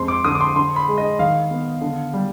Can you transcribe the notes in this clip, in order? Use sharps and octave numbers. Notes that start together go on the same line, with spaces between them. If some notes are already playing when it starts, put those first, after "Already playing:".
Already playing: F2 G#3 C6
D6
D3 D#6
D6
C6
D3 C6
B5
G#3
D#5
D#3 F5
B3
D3
G3